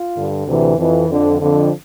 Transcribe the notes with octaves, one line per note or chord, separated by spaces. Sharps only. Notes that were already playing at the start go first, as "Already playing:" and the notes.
Already playing: F4
G2 D3
D2 C3 E3
F2 E3
F2 D3
F2 D3